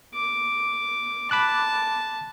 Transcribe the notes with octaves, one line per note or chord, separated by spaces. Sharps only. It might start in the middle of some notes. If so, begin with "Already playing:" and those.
D6
A5 B5 D6 F#6